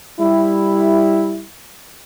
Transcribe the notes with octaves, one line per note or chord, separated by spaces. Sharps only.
G3 E4